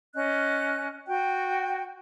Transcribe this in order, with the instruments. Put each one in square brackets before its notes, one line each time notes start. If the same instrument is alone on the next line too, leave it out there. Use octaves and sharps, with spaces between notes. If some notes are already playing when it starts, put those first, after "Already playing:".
[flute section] C#4 D#5 F#6
F#4 G5